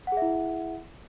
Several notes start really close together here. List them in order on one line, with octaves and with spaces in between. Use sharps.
F#5 G#4 E5 E4